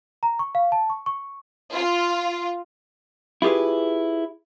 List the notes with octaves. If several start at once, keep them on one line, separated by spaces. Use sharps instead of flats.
A#5
C#6
F5
A5
C#6
C#6
F4
E4 F4 G4 G#4 B4